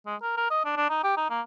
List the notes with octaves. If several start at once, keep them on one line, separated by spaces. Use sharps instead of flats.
G#3
A#4
A#4
D#5
D4
D4
D#4
G4
D#4
A#3